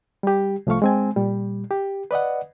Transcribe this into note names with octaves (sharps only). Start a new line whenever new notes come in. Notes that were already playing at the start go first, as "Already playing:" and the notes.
G3 G4
C2 F3 A3 F5 C#6
G#3 C4 G#5
A#2 G3
G4
B4 D5 D#5 F#5